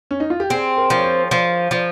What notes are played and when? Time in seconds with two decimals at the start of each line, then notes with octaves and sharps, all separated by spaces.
0.11 C#4
0.20 D#4
0.30 F4
0.40 G4
0.50 C4 G#4
0.77 A#4
0.90 F3
0.98 C#5
1.04 C5
1.31 F3
1.71 F3